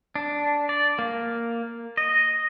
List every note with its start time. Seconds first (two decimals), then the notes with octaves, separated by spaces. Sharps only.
0.16 D4
0.69 D5
0.99 A#3
1.97 D#5